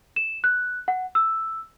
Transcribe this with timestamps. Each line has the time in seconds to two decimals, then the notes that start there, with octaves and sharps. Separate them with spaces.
0.16 E7
0.44 F#6
0.88 F#5
1.15 E6